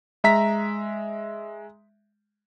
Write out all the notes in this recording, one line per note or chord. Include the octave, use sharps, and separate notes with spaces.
G#3 E5 A#5 B6